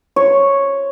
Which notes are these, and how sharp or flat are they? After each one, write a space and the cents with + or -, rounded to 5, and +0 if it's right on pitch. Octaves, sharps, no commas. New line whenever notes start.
C#5 -5